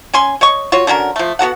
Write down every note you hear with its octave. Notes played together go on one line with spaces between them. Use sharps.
C#4 G#5 C6
C#5 D#5 C#6
F4 F#4 C#5
D3 C#4 F#4 A#4
F3 A3
B3 F#4 A4 F#5